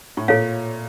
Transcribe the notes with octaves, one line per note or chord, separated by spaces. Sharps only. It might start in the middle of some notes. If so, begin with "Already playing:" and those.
A2
A#2 A4 C#5 F5